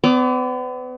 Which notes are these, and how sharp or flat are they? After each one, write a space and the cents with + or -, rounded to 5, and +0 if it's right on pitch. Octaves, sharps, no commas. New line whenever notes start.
B3 +40 D5 -30 D6 +0